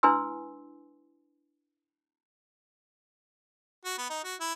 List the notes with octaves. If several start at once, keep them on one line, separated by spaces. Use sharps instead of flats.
D4 E4 B4 G#5 C6 E6
F#4
B3
D#4
F#4
E4